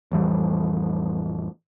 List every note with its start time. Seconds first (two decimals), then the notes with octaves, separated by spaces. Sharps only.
0.12 A1 F2 E3 G3